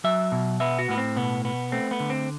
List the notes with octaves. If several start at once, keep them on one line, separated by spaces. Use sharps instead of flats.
F#3 E5
B2
B3 E5
F#4
A2 B3
C4
B2 B3
B3
A3 C4
B3
D3
C4